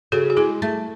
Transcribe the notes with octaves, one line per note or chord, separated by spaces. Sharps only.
C#3 F#4 A4
F#4
G#3 E4 G#4
A3